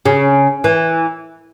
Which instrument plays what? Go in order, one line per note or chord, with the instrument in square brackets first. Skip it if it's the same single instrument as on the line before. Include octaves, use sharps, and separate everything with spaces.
[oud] C#3
E3